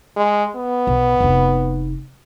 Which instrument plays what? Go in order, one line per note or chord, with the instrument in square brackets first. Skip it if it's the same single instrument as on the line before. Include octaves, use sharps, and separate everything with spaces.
[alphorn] G#3
B3
[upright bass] B1
F1 D#4